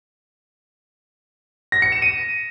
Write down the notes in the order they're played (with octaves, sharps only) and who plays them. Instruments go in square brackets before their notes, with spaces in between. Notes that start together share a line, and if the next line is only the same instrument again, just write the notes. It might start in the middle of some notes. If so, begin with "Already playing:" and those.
[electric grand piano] A#6
C#7
E7
D#7